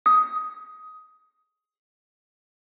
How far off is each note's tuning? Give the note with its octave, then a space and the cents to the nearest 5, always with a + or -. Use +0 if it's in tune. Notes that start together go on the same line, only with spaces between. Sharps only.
D#6 +15